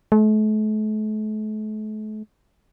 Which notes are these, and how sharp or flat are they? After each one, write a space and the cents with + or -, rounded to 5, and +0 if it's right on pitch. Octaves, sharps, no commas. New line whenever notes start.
A3 -40